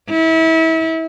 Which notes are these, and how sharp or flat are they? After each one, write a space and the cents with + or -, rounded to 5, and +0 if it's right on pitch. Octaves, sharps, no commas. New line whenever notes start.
E4 -30